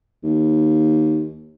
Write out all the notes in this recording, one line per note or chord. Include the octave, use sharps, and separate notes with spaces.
D#2